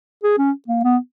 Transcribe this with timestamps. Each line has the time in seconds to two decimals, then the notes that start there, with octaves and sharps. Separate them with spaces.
0.23 G#4
0.38 C#4
0.68 A#3
0.84 B3